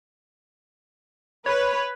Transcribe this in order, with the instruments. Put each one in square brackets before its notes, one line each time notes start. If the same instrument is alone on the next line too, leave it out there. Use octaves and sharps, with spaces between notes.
[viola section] B4 [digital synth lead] C#5